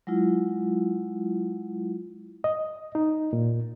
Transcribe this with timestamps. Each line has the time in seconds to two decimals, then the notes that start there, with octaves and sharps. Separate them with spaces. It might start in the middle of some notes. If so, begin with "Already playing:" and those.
0.07 F#3 G#3 E4 F4
2.44 D#5
2.95 D#4
3.33 A#2